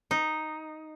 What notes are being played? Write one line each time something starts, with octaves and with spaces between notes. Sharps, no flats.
D#4